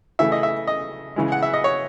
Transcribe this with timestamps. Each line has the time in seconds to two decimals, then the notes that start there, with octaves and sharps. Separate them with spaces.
0.19 C#3 E3 A3 E5
0.32 D#5
0.43 E5
0.67 D#5
1.16 C#3 E3 G#3
1.32 F#5
1.43 E5
1.54 D#5
1.64 C#5